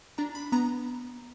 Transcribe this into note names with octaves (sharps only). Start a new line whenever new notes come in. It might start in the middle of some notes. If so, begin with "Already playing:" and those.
D4 A#5
B5
B3 A#5